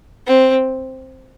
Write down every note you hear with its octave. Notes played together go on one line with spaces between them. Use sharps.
C4